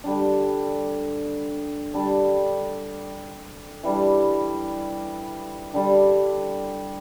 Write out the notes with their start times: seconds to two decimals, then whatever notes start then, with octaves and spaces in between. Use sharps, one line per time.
0.04 D3 G3 D4
1.94 D3 G3 D4 A4
3.83 E3 G3 D4
5.74 D3 G3 D4